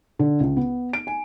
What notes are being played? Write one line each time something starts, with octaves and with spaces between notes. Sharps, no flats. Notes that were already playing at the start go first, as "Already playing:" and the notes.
D3
C#2
B3
D7
G#5